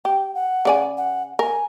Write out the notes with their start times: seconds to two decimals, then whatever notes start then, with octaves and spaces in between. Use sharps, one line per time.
0.05 G4 G5
0.35 F#5
0.65 C#3 D5 G#5
0.97 F#5
1.39 A#4 G#5